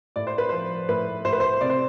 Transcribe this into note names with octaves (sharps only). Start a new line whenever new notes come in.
A2 D5
C5
B4
F3 C5
A2 B4
A2 C5
B4
C5
C3 D5
C5